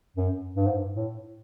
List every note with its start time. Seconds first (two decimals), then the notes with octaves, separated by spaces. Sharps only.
0.16 F#2
0.56 G2
0.67 G#2
0.77 G2
0.95 A2